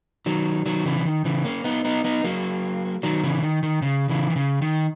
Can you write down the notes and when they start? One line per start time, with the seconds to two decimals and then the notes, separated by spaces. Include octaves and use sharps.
0.26 D#3 F#3
0.66 D#3 F#3
0.85 C#3 E3
0.99 C#3
1.05 D#3
1.25 C#3 E3
1.45 A#3 C#4
1.64 B3 D#4
1.85 B3 D#4
2.04 B3 D#4
2.24 F#3 A#3
3.03 D#3 F#3
3.23 C#3 E3
3.37 C#3
3.43 D#3
3.63 D#3
3.82 C#3
4.09 C#3 E3
4.30 D#3
4.36 C#3
4.62 D#3